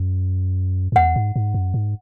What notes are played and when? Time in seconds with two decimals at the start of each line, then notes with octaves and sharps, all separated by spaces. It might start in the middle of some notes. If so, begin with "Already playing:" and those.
Already playing: F#2
0.92 F#2
0.95 E2 F#5
1.16 G#2
1.36 G#2
1.54 F#2
1.74 G#2